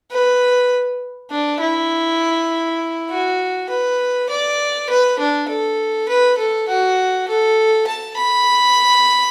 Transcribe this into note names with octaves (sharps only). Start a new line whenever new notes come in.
B4
D4
E4
F#4
B4
D5
B4
D4
A4
B4
A4
F#4
A4
A5
B5